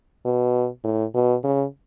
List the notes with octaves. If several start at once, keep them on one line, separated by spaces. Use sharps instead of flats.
B2
A2
B2
C#3